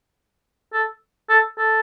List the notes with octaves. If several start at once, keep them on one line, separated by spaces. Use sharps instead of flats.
A4
A4
A4